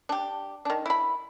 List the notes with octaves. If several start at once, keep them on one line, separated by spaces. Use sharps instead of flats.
D4 G4
D#3 D4
E4 B5